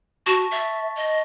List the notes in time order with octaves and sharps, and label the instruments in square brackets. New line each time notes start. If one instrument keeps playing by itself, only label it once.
[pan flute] F#4 [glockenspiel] A5 C#6 A#6
[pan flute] E5 [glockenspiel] A6 A#6
[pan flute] D#5